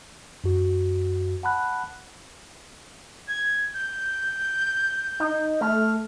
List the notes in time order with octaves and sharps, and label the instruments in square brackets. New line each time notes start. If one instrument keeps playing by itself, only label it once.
[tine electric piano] F#2 F#4
F#5 A5 B5 F#6
[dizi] G#6
G6
[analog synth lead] D#4
[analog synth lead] A3 [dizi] F6